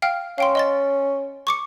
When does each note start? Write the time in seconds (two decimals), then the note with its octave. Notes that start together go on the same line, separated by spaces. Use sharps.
0.02 F5 G5 F6
0.38 C#4 F5 G5 C6
0.55 D#5 C6 A6
1.47 C#6 D6 C#7